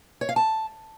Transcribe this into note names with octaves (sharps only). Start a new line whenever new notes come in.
C#5
F5
A5